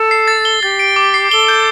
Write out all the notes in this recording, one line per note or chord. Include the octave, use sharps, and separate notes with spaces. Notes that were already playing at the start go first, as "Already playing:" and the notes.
Already playing: A4
C7
A6
G7
G4 A6
D7
D6
C7
A4 G7
G6